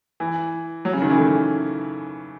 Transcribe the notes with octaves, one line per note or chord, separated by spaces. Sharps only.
E3
F#3
C#3
D#3
E3
A3